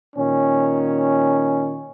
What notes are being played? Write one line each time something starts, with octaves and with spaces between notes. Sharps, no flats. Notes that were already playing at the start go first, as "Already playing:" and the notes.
A#2 D#3 C#4